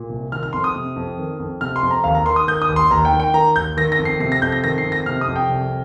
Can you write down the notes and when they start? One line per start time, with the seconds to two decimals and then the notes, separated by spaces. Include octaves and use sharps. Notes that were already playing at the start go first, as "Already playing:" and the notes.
Already playing: A#2
0.10 C2
0.32 D#3 F6
0.43 F6
0.53 F2 C6
0.64 D#6
0.75 C3
0.96 F2
1.18 D#3
1.40 F2
1.61 C3 F6
1.76 C6
1.83 F2
1.91 A#5
2.04 D#2 F5
2.15 A#5
2.26 D#3 C6
2.36 D#6
2.47 D#3 G6
2.62 D#6
2.69 D#2
2.76 C6
2.91 D#2 A#5
3.05 G5
3.12 D#3
3.20 G5
3.34 D#3 A#5
3.56 D#2 G6
3.77 D#3 A#6
3.92 A#6
3.99 F2
4.05 C7
4.20 C3 C7
4.32 A#6
4.42 F2 G6
4.52 A#6
4.64 D#3 A#6
4.78 C7
4.85 F2
4.92 A#6
5.06 C3 F6
5.21 D#6
5.28 F2
5.36 G5
5.49 C2